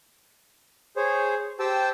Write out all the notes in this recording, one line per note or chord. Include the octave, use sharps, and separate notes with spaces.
G#4 C5 C#5
G4 C5 G5 A5 E6